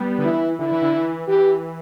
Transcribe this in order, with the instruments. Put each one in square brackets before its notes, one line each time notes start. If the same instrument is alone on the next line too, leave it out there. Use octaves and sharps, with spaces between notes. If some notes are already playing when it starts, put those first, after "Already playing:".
Already playing: [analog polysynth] G3 B3
D3
[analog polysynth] E3 [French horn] E4
[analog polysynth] D3 [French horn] E4
[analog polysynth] E3
D3
E3
[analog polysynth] E3 [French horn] G4